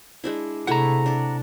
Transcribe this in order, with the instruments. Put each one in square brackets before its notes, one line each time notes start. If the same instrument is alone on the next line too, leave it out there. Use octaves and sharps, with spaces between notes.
[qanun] G#3 D4 E4
[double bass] C3 [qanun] G#3 A3 E4 [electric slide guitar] F#5 A#5
[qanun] D4 D5